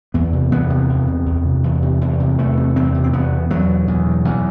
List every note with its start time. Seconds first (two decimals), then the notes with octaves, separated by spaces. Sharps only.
0.14 E2 B3
0.33 C3
0.51 E2 B3
0.70 C3
0.89 E2
1.08 C3
1.26 E2
1.45 C3
1.64 E2
1.82 C3
2.01 E2
2.20 C3
2.38 E2 A3
2.57 C3
2.76 E2 C4
2.94 C3
3.04 C4
3.13 E2 B3
3.32 B2
3.50 E2 F#3
3.69 B2
3.88 E2
4.06 B2
4.25 E2